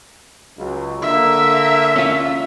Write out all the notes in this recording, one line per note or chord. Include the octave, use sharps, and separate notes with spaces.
C#2 F#3
D3 A#3 E5
C#4 F4